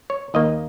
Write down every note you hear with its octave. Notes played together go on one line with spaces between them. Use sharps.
C#5
D#2 D#3 A#3 D#5